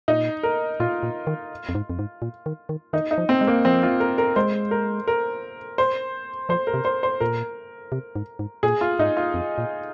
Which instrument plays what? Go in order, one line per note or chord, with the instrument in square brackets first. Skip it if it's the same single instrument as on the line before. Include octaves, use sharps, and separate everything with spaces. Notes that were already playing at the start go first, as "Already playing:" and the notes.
[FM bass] A#2 [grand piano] D#4
[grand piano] A#4
[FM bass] A#2 [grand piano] F4
[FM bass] A#2
D#3
F2
G#2
F2
G#2
A#2
D#3
D#3
[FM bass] D#3 [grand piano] D#4
[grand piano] D#4
[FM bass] F3
[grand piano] C4
[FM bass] G#3
[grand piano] A#3
[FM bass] F3 [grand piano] C4
[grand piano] F4
A#4
A#4
[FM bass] G#3 [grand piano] C5
[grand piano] A#4
A#4
C5
[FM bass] F3 [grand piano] C5
[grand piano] A#4
[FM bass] C3
[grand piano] C5
C5
[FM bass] A#2 [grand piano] A#4
[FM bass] C3
G#2
G#2
[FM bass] A#2 [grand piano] G#4
[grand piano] F4
[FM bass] G#2 [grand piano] D#4
[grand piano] F4
[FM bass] F2
A#2